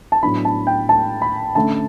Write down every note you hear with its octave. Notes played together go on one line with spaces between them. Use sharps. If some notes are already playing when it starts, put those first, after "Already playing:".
A5
A2 F#3 B3 D4 B5
A5
G5
A5
B5
D3 A3 C#4 A5